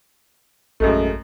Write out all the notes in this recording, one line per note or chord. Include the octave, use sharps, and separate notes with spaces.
A#1 F#2 G#3 A3